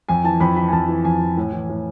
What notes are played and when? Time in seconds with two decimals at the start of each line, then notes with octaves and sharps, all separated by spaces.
0.09 F2 G#5
0.24 E3 A5
0.40 F2 B5
0.56 E3 B5
0.68 G#5
0.73 F2 A5
0.88 E3
1.05 F2 G#5
1.21 E3
1.37 A2
1.52 E3
1.69 A2